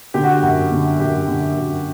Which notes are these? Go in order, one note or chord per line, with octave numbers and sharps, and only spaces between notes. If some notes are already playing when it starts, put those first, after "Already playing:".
D3 G4
F#4
F#2 F#4
D3
F#2 G4
D3
F#2